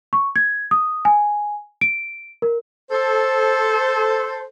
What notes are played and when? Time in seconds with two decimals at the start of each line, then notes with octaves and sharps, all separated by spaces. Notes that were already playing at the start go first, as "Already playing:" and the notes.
0.13 C#6
0.36 G#6
0.71 D#6
1.05 G#5
1.81 D7
2.42 A#4
2.91 A4 C5